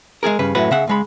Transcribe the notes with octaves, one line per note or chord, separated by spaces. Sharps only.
G#3 A3 G#4 A#4
G2 C#3 B4
F#2 A2 F#4 B4
C#3 E5 F#5
C#2 G#3 B5